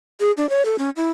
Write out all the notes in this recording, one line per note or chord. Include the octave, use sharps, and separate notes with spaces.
G#4
D4
C#5
A4
C#4
E4